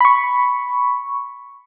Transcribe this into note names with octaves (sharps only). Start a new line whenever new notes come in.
B5 C#6